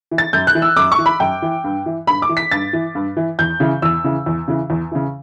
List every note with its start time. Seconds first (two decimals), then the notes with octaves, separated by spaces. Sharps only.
0.11 E3
0.18 A6
0.33 F#2 G6
0.47 F#6
0.55 E3
0.62 E6
0.77 F#2 D6
0.92 C#6
0.98 E3
1.06 B5
1.20 F#2 G5
1.42 E3
1.64 G2
1.86 E3
2.07 G2 B5
2.22 D6
2.29 E3
2.37 B6
2.51 G2 A6
2.73 E3
2.95 G2
3.17 E3
3.39 E2 G6
3.60 C#3 E3
3.82 E2 E6
4.04 C#3 E3
4.26 E2
4.48 C#3 E3
4.70 E2
4.92 C#3 E3